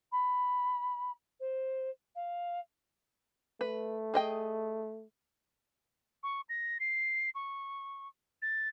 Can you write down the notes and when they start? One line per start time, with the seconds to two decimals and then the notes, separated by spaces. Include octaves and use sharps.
0.12 B5
1.40 C5
2.15 F5
3.61 A3 B4
4.14 G#4 D#5 G5
6.23 C#6
6.49 A#6
6.80 C7
7.35 C#6
8.42 A6